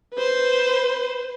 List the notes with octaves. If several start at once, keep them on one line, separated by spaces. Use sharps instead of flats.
B4 C5